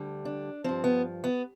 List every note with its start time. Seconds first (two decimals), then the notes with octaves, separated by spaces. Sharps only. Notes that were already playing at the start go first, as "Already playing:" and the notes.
Already playing: D2 D3 G3
0.25 D4
0.64 G2 F3 C4
0.84 B3
1.24 B3